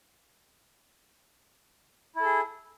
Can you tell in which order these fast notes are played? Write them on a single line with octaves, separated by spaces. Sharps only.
E4 A4 G#4